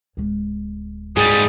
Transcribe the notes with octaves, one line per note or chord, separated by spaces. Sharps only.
D1 G#3
G#2 G3 G#4 D#6 A6